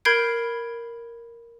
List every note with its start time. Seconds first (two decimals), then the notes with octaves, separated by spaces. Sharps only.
0.05 A#4 B5 G6 G#6 C7 D7